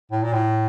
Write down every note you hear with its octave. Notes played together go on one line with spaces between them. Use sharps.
A2
A#2
A2